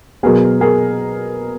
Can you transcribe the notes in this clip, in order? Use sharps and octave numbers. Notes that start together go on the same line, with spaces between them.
B2 F#3 B3 G#4 A#4
G#4 A#4